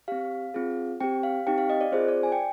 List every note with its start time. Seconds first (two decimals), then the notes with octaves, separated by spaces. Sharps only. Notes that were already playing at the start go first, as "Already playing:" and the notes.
0.08 C4 G4 F5
0.54 C4 F4 G#4
1.00 C4 G4 G5
1.23 F5
1.47 C4 D#4 G4 G5
1.58 F5
1.70 D#5
1.81 D5
1.92 C4 F4 G#4 C5
2.08 D5
2.23 G#5
2.32 G5